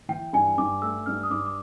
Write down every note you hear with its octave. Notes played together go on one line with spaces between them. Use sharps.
E3 G5
G2 G#5
G2 D6
A3 E6
G2 F6
D#6
G2 D6
D6